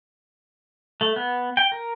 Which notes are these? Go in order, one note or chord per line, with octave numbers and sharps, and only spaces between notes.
A3
B3
G5
A#4